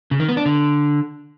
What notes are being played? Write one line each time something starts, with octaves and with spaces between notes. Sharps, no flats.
C#3
D#3
B3
D4
D3